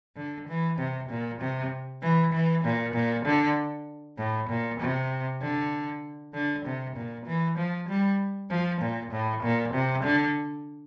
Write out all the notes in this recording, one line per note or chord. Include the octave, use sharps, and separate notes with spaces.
D3
E3
C3
A#2
C3
E3
E3
A#2
A#2
D3
A2
A#2
C3
D3
D3
C3
A#2
E3
F3
G3
F3
A#2
A2
A#2
C3
D3